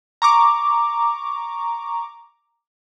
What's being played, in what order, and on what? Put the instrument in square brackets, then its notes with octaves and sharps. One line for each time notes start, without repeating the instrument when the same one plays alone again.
[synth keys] A#5 C#6 D6